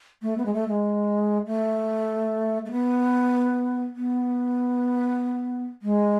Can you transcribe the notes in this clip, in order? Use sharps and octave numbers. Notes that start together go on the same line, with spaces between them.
A3
B3
G#3
A3
G#3
A3
A3
B3
B3
G#3